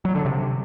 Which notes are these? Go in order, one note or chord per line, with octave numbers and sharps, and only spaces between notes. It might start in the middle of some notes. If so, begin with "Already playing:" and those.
F#3
D3
C3